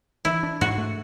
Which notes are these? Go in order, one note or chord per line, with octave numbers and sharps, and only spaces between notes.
E3 E4
D4
G#2 F#4
A3